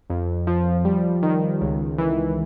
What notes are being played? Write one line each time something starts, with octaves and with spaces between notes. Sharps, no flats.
F2
F3
G3
D#3
C#2
E3